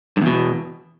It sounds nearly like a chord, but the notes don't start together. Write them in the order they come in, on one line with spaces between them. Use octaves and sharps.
G2 E2 B2